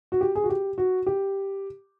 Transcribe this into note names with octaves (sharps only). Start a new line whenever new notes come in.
F#4
G4
G#4
F#4
G4
F#4
G4